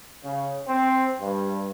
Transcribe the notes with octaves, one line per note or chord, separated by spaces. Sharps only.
C#3
C4
G2